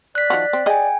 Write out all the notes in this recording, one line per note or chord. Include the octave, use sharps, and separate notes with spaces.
D5 F#6 B6
D#3 F3 F#4
C4
G#4 D#5 G5 G#5